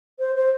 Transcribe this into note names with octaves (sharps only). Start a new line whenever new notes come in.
C5
C5